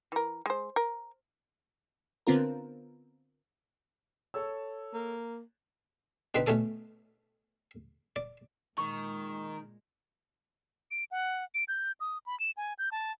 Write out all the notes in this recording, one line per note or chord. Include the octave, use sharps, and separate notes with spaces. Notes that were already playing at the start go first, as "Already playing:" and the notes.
E3 A#4
G#3 C5
A#4
D3 B3 C4 F4 A#4
A4 C#5 E6
A#3
B2 D3 C4 D#4 B4
B2 A3 C#4 A4 D#6
D5
A#2 D#3 G#3 C#6
D7
F#5
D7
G6
D#6
B5
E7
G#5
G6
A5